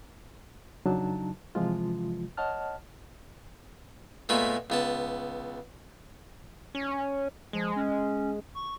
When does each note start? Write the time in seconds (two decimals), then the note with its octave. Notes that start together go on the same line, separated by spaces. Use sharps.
0.85 F2 C#3 F#3 D4 D#4 A5
1.55 C3 E3 F3 G#3 F4
2.37 C#5 D#5 F#5 A5 F6
4.29 A#2 G#3 A3 B3 B5
4.70 C#2 B3 A5
6.75 C#4
7.53 F3 G#3
7.76 C#4
8.55 C#6